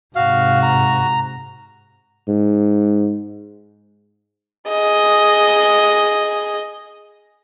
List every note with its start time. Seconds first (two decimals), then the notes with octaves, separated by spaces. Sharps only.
0.16 G#2 C3 F#4 F5
0.63 A#5
2.28 G#2
4.69 G#4 D#5